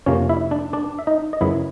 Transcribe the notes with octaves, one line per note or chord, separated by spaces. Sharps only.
F2 C3 F3 A#3 C#4 C#5
E4 E5
D4 D5
D4 D5
E5
D#4 D#5
D#5
F#2 C#3 F#3 B3 E4 E5